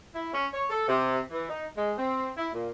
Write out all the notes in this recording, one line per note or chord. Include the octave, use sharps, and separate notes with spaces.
E4
C#4
C#5
A4
C3
E3
D#4
G#3
C4
E4
A#2